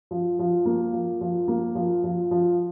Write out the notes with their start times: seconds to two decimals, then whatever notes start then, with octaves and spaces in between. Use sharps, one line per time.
0.11 F3
0.39 F3
0.65 A#3
0.93 F3
1.21 F3
1.48 A#3
1.75 F3
2.04 F3
2.31 F3